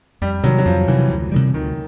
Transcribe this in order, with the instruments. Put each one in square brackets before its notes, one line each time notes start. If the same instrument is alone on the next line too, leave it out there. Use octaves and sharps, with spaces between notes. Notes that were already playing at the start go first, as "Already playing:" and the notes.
[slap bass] F2 [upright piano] G3
[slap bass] C3 [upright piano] F#3
[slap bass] D#3
[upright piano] F#3
[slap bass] F2 [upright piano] F3
[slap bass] C3 D#3 [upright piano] E3
[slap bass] D2
C3 D#3 G3
[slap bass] D2 [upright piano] D#3